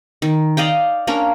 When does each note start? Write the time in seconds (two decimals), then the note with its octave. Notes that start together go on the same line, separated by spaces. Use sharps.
0.22 D#3
0.57 D5 D#5 F5 G5
1.07 A#3 C#4 D4 A#4